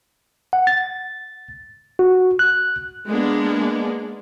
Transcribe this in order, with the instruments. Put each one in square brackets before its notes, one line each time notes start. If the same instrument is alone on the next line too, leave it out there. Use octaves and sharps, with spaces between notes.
[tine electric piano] F#5
A6
F#4
F#6
[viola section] G#3 A#3 B3 D4